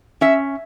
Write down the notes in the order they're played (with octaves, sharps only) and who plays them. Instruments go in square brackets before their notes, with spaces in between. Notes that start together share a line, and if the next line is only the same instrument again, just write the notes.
[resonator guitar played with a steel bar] C#4 E5